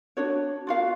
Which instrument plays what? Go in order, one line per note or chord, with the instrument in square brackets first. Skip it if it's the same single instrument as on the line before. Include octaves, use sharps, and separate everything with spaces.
[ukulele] D4 F#4 C#5
F4 F#4 F5